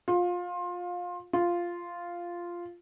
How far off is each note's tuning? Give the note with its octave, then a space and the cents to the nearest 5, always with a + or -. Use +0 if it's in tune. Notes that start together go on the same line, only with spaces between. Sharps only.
F4 +20
F4 -5